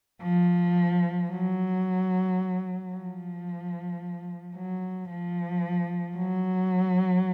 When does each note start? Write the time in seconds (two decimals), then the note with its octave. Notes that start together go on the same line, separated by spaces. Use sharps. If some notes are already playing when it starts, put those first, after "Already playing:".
0.23 F3
1.30 F#3
2.93 F3
4.56 F#3
5.10 F3
6.17 F#3